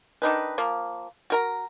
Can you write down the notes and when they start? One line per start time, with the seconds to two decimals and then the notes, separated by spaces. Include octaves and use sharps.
0.22 D#3 D4 D#4 B4
0.58 F3 A#3
1.30 F#4 A#4 A#5